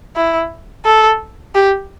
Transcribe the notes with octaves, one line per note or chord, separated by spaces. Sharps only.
E4
A4
G4